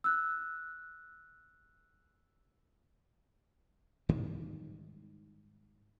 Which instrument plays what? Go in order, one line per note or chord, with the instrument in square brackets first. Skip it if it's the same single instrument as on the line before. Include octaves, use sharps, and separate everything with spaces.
[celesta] E6 F#6
[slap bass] G#2 D#3 E3 G3